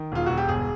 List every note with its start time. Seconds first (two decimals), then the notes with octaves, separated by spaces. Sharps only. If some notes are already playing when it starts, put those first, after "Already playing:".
Already playing: D#3
0.12 E1 F4
0.26 E1 F#4
0.37 G4
0.48 G1 G#4